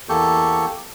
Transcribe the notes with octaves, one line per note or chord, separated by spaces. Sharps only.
E2 A#3 G4 A4 C#6 G6